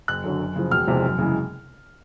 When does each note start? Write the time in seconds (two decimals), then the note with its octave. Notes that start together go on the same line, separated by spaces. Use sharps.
0.08 F#1 F#6
0.24 F#2 D3 F#3
0.40 F#2
0.56 C#3 F3
0.71 E1 F6
0.87 E2 C3 F3 G#3
1.02 F#2
1.19 C#3 E3 G#3